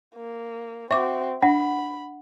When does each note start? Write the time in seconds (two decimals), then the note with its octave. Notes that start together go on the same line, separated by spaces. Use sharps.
0.15 A#3
0.91 C4 F#4 E5 C#6 D6
1.42 D4 F#5 B5